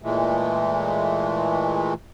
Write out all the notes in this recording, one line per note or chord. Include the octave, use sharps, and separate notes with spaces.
A#2 E3 G#3 A3